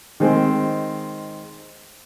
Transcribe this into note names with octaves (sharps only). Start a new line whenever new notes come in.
D#3 G#3 C4